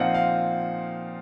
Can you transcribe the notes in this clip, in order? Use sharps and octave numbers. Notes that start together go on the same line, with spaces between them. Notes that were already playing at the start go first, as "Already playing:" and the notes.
Already playing: A#2 F3 C4 D#4 F5 F#5
F5